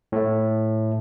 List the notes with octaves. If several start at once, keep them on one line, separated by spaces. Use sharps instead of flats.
A2 A3